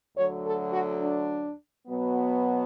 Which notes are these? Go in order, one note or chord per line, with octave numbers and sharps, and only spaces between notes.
D2 D3 F#3 C#5
A4
F#4
D4
B2 F#3 B3